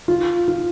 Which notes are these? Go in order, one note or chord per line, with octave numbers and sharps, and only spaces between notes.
F4
F4